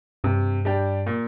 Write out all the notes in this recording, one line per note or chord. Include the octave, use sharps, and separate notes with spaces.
G2 C3
G3 D4 G4
A#2